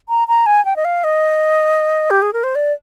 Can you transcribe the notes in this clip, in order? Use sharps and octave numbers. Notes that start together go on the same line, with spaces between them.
A#5
A#5
G#5
G5
D#5
F5
D#5
G4
G#4
A#4
C5
D5